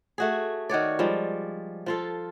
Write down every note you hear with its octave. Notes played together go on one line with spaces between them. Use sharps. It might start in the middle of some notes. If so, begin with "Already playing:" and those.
A3 F#4 G#4
D#3 F#4 C#5 D5
F3 G3 G#3
F3 F4 A4